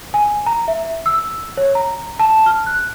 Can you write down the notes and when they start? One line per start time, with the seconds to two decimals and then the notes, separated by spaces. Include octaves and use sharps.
0.14 G#5
0.46 A#5
0.68 E5
1.06 E6
1.57 C#5
1.75 A#5
2.20 A5
2.46 F6
2.67 F#6